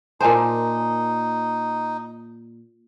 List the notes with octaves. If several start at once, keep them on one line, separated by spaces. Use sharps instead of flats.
A#2 D#4 A#4 C5 G#5 A5